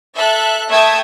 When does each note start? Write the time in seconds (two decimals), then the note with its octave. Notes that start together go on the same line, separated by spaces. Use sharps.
0.15 A4 E5 F#6
0.70 A3 E5 G5 A5 D#6 G#6